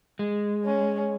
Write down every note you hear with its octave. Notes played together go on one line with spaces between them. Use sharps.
G#3
C#4